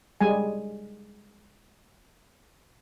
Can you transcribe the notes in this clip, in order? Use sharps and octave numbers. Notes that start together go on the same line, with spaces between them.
G3 G#3 G#5